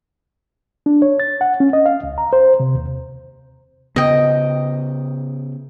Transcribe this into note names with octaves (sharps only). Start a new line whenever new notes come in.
D4
C#5
A6
F#5
C#4
D#5
F5
C#2
A#5
C5
C3
D#2
C#3 B3 D#5 G5